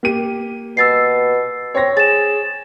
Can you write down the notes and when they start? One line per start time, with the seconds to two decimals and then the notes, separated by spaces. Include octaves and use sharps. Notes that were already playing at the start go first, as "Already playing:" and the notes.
0.03 A#3 G4 D#7
0.77 B2 E6 A6 C7
1.75 C4 C#5 A#6
1.97 G#4 A6 E7